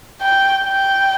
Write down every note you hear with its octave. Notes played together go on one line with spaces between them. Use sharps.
G5
G5